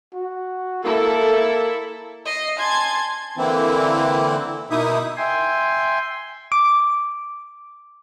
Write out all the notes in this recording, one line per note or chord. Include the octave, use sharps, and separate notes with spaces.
F#4
A#3 E4 A4
D#5 C7
G#5 A5 C6 G#6
D3 E3 A#3 C4 E4
B2 A#3 D#4 E4 E5 D#6
E5 G5 G#5 C6
D6